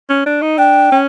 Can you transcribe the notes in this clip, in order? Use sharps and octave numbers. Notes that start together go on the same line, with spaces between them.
C#4
D4
D#4
D4 G5
C#4